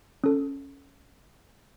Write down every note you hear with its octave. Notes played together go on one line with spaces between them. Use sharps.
C#4 A4